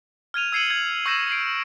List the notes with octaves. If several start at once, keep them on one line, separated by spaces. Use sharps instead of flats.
F6 G#6 D#7 F7
E6 G#6 C7 C#7 D#7 F#7
G#6 F#7
C#6 E6 G6 A#6 C7 E7
C7 D7